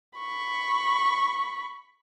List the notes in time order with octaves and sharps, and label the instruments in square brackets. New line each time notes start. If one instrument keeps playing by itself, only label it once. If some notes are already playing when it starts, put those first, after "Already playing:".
[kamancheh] B5 C#6